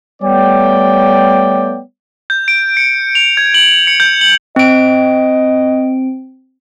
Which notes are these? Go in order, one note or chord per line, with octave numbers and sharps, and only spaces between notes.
G3 A3 B3 C#5 D5 G5
G6
D7
C#7
F7
G#6
F#7
C#7
G6
F#7
C4 D#5 D7